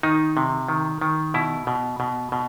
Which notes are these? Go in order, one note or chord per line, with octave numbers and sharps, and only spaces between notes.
D#3 D#4
C3
D#3
D#3
B2 E4
B2
B2
B2